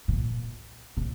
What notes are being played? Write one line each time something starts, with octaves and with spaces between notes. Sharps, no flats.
A#2
A#2